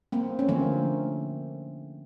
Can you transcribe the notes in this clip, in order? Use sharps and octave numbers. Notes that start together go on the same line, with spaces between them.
A#3 C4
C#4
D3 F3 A3 A#3 C4